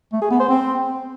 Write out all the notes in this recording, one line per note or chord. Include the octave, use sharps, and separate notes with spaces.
A3
G#4
B3
C5
C4